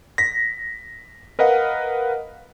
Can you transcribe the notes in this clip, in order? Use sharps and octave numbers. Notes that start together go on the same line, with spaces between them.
A#6 B6
A#4 B4 D#5 F5 F#5